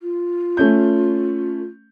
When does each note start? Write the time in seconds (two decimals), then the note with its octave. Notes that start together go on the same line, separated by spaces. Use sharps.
0.03 F4
0.57 A3 C#4 G6